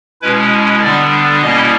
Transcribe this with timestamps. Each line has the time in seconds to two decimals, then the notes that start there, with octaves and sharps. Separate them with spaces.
0.22 B2 G#3 C#4 E4 B4
0.82 D3 G3 B3 D4 D5
1.42 B2 G3 A#3 C#4 E4 D#5